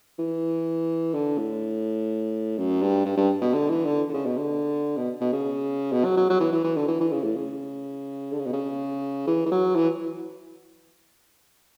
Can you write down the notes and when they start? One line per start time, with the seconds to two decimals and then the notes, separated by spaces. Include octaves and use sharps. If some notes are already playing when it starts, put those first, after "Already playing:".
0.19 E3
1.14 D3
1.38 A2
2.58 F#2
2.82 G2
3.05 G2
3.17 G2
3.41 B2
3.54 D3
3.70 E3
3.85 D3
4.09 D3
4.14 C#3
4.26 B2
4.37 D3
4.97 B2
5.21 B2
5.33 C#3
5.92 B2
6.04 F#3
6.17 F#3
6.30 F#3
6.40 E3
6.52 E3
6.64 E3
6.77 D3
6.88 E3
7.00 E3
7.12 C#3
7.24 A2
7.37 C#3
8.32 D3
8.39 C#3
8.46 B2
8.53 C#3
9.27 E3
9.46 E3
9.51 F#3
9.76 E3